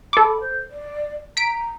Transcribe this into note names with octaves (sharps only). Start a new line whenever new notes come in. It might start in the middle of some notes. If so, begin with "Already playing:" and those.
A4 B5 D6
C5
D5
A#5 B6 D7